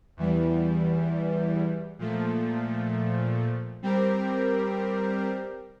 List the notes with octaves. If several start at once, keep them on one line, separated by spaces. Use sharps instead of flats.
E2 E3 G3
A#2 F3 A3
G3 C4 G4 A#4